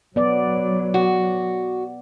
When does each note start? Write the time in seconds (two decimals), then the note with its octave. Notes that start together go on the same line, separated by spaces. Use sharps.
0.16 F#3 B3 D5
0.94 F#4